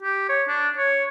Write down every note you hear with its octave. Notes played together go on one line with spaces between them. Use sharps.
G4
C#5
D4
C#5